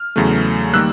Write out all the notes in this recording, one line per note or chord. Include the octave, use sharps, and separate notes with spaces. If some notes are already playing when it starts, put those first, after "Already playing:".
Already playing: F6
E2 C#3 F#3 A3
D#3 G3 A#3 E6 F#6